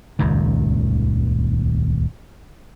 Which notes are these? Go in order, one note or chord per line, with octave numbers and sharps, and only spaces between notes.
D#1 C#2 F#2 D#3